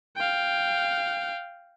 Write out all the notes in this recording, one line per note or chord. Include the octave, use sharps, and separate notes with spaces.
F5 G5